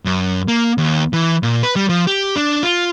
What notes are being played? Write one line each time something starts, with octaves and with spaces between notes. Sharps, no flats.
F#2
A#3
D#2
E3
A#2
B4
G3
F3
G4
D4
F4